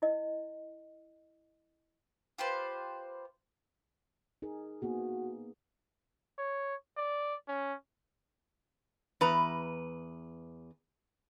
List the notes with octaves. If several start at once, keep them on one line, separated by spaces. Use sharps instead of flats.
E4 D#5
F4 G4 B4 C5
D#4 G#4 A#4
A#3 B3 F#4 G#4
C#5
D5
C#4
E2 B4 A#5